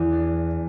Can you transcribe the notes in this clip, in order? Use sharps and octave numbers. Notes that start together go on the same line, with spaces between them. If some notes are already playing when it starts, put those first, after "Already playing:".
Already playing: E2 E3
D4